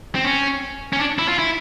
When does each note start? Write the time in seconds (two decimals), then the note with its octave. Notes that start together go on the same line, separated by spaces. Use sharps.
0.15 C4
0.24 C#4
0.93 C#4
0.99 D4
1.19 E4
1.28 F4
1.39 E4